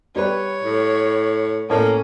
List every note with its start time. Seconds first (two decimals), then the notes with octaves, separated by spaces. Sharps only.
0.16 G3 B4 C#5
0.64 A2
1.70 A2 A#3 C#4 C#5